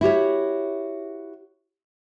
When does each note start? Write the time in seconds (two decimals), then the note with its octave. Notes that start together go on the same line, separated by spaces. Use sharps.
0.01 E4 F#4 G4 C#5